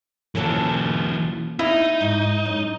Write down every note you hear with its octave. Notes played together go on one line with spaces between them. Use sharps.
E3 F#3 A#3 C#4 A4
D#4 E4
G#2
F#2